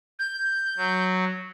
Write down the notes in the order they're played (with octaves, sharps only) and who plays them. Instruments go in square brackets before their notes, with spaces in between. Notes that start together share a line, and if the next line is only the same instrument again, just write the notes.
[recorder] G6
[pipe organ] F#3